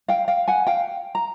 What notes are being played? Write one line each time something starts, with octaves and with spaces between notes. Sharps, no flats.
F5 G5
F5 G5
F#5 G#5
F5 G5
A#5